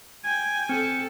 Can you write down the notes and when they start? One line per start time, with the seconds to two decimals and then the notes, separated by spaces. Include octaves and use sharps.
0.24 G5 G#5 G#6
0.69 C4 A4 C#7